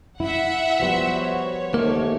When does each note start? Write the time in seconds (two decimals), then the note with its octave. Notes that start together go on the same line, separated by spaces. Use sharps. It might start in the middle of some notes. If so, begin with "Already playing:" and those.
0.20 E4 E5 F#5
0.80 F3 G3 B3 F#4 B4 C5
1.19 C#5
1.74 D#2 G#2 A3 A#3 D#4